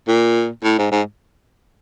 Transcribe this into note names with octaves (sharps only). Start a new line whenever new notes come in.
A#2
A2
G#2
G#2